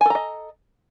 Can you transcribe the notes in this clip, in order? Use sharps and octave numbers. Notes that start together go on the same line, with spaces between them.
A4 D#5 G#5 A#5